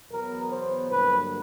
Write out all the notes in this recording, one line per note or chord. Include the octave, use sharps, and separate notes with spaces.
E2 B2 F#3 B3 A#4
C5
G2 D3 F#3 A#3 B4